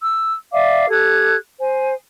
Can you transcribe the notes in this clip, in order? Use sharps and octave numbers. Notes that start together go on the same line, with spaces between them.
E6
D5 E5 F5 D6
G4 A4 F#6 G#6
C5 G#5